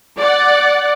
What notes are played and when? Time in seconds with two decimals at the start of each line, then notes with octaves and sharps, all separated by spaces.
0.18 D5 F#5